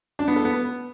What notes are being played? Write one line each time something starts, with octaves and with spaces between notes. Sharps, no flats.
D4
B3
A4
B3